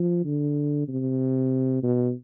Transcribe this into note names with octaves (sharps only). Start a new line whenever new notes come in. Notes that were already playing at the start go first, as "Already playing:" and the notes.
Already playing: F3
D3
C3
B2